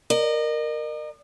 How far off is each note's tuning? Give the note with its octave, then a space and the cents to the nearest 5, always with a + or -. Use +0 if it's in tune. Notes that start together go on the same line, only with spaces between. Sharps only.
A#4 +0 D#5 -40